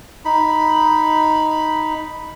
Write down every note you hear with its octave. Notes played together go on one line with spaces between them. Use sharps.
D#4 B5